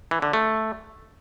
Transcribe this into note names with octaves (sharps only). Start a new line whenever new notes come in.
E3
D3
A3